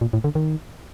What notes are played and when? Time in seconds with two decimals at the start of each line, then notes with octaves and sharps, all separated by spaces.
0.01 A#2
0.13 A2
0.24 D3
0.35 D#3